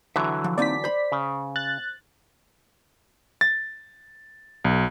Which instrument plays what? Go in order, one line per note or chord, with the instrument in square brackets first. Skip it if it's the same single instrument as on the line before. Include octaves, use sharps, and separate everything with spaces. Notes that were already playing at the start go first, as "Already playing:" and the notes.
[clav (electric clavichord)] D3 E3 F#3 [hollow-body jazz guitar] E5
[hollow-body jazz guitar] F3
[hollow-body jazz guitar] A#3 C4 D#4 [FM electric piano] D5 B6
[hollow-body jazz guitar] C5 B5
[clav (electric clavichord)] C#3
[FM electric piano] F#6 A6
[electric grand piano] A6
B1